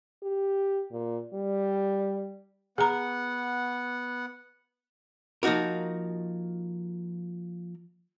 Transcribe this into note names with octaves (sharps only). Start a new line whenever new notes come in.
G4
A#2
G3
B3 G#4 F#5 A#5
F3 A#3 D#4 F#4 A#4